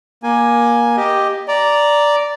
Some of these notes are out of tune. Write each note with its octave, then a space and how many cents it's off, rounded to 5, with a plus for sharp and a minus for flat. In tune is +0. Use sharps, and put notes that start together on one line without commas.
A#3 +20 G#5 +0
G4 +0 D#5 +0
D5 -5 A#5 +0